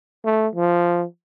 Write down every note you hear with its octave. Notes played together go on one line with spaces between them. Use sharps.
A3
F3